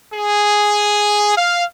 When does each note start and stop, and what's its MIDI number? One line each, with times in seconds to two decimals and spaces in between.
0.12 1.34 68
1.37 1.65 77